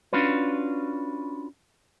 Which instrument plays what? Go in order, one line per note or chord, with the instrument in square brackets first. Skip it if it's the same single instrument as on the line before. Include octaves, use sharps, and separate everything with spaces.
[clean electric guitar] C#4 D4 F4 F#4 B4